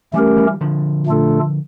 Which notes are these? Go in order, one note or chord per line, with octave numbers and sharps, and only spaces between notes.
E3 G3 A3 C#4 G4 A#4
E3 G3
D3 F3
A#2 A3 D4 F4 A4